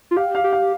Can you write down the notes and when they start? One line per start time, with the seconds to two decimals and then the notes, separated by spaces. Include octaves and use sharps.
0.11 F4
0.17 G4 F5
0.35 F5
0.44 G4
0.53 F5